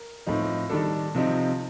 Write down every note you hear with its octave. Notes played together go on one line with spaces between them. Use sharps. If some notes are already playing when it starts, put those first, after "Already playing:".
Already playing: A#4
A2 F3 C4 D#4
D#3 G3 D4 A4
C3 F3 C4 D#4